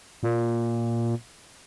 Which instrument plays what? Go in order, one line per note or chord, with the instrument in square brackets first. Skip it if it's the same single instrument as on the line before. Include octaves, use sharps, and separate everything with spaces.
[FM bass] A#2